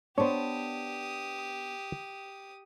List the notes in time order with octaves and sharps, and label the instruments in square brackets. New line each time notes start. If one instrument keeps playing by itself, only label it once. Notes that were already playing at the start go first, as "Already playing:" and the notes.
[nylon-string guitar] B3 D4 [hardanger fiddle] G4 D#6 [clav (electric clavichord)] C5 C#5